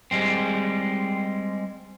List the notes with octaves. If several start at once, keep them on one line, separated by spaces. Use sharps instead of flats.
G3 G#3 C4